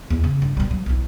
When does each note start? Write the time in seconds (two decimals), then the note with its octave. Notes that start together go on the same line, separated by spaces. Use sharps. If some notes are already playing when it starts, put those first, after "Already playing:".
0.10 E2
0.24 C#3
0.42 G2
0.57 B2 G3
0.71 F#3
0.86 B1 E4